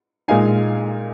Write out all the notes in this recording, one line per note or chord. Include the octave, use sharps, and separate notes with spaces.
A#2 G#3 D#4 F5 G#5